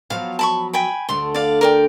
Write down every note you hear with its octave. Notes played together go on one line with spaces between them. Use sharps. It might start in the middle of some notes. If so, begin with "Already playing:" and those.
F3 F#3 B3 F5
A5 B5 C#6
G5 G#5 B5
D2 D3 A3 C6
D5 F5
A#4 D5 G5